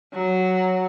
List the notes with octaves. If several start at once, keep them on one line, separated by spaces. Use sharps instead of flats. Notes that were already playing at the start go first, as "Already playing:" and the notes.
F#3